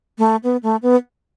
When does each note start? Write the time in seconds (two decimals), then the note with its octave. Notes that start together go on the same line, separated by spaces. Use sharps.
0.18 A3
0.44 B3
0.63 A3
0.82 B3